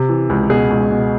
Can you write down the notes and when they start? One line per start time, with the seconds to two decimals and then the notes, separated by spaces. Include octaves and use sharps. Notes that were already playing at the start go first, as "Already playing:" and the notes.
Already playing: C3
0.09 E3
0.29 C#2
0.50 B2 G#4
0.70 C#2
0.91 B2